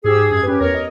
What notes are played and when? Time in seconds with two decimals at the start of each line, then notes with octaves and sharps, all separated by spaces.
0.04 G#2 G4 G#4 E6
0.31 F#2 G#6
0.43 C#4 G4 B4
0.60 E2 A#4 C#5
0.74 D#5